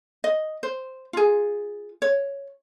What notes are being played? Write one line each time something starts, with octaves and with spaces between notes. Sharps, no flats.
D#5
C5
F4 G#4
C#5